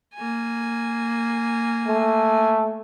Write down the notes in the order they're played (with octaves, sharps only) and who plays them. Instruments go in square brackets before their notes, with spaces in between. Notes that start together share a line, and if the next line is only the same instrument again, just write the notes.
[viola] A#3 G#5
[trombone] A3